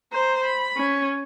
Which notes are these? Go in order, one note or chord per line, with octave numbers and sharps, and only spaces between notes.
C5 A#5
B5
C#4